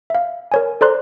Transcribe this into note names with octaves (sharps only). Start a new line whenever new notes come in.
E5 F5
A#4 C#5 G#5
A4 C5 D5 A#5 C6 F#6